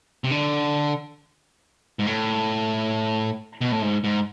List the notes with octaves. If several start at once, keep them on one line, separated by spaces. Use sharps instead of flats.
C3
D3
G#2
A2
B2
A2
G#2
G#2